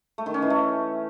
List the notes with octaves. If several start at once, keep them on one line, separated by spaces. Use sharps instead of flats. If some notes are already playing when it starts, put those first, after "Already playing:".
A3
D#3
C#4
E3
A3